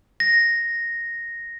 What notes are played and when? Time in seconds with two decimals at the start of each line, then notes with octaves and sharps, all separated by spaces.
0.20 A#6